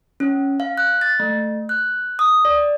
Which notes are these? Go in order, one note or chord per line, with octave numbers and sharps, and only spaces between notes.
C#4
F5
F#6
A6
A3
F#6
D#6
D5